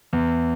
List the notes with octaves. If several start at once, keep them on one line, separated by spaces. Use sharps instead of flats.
E2